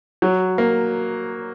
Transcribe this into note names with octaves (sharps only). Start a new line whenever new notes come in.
F#3
A#3